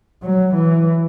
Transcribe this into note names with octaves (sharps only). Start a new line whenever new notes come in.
F#3
E3